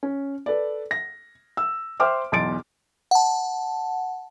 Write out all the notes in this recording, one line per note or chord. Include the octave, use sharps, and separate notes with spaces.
C#4
A4 B4 D5
A#6
E6
C5 E5 G5 C6 D6 F6
B1 E2 C6 A6 D7
F#5 A5